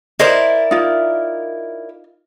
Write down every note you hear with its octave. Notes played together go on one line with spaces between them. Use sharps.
E4 A#4 C5 D5 D#5
D#4 F4